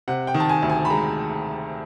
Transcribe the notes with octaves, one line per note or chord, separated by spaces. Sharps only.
C3 F#5
G5
D#3
A5
G#5
D2
G#5
B5
G#3 A#5